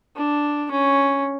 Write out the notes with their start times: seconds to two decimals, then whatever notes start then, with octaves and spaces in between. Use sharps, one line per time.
0.16 D4
0.71 C#4